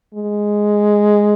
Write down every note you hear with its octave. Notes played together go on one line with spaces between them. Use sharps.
G#3